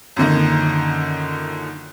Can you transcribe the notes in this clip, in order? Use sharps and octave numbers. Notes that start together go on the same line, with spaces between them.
F#2 A#2 D3 D#3